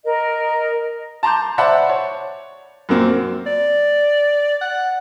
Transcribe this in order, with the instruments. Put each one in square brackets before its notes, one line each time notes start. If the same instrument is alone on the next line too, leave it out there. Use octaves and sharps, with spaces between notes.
[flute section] A#4 D#5
[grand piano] A5 A#5 C6 D6 G6
C5 D5 E5 F#5 A5 B5
C#5
F#2 A#2 A#3 C4
[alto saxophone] D5
F#5